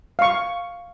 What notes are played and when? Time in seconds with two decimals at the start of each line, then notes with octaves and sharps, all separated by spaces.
0.19 F5 C#6